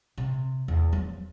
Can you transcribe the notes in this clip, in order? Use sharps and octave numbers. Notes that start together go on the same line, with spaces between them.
C3
E2
F3 F#3